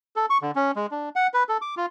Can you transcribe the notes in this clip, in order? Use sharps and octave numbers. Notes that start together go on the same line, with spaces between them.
A4
C#6
D3
C#4
G#3
D4
F#5
B4
A4
D6
F4